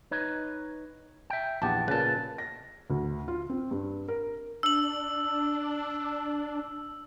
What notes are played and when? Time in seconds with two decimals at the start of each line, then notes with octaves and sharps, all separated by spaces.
0.11 D#4 B4 C#5
1.30 E5 G5
1.62 A#1 E2 G4 F#5 A5
1.88 A#2 C#3 B4 A5
2.38 A#6
2.90 D2
3.28 F4
3.50 C4
3.71 G2
4.08 A#4
4.63 D4 E6 F#7